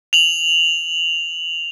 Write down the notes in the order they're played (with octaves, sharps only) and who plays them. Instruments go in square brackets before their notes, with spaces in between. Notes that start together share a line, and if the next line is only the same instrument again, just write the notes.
[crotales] F7 F#7